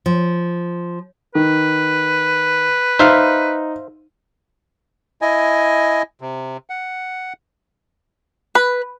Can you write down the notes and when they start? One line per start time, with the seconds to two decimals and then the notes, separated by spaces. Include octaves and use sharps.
0.06 F3
1.35 D#3 B4
2.99 D#4 C5 E5 F5
5.22 E4 D#5 G#5
6.21 C3
6.70 F#5
8.55 B4